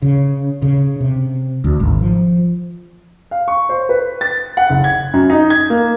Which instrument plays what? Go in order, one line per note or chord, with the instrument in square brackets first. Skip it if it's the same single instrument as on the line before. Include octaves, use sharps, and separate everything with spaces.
[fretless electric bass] C#3
C#3
C3
D2
G#1
F3
[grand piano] F5
C#6
C5
B4
A6
F#5
F#1
G#6
F#2
D#4
G#6
A#3